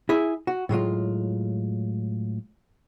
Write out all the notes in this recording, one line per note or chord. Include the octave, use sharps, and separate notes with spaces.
E4 G#4 E5
F#4
A2 F#3 G#3 F4